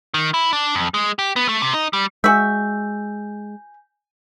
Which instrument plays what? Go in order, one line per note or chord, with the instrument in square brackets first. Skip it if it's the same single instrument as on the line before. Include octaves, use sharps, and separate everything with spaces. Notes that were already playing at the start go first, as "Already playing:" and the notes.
[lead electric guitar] D#3
E4
D4
F2
G#3
G4
B3
A3
C3
D#4
G3
[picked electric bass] G#3 [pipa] F#4 E5 [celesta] G#5 G6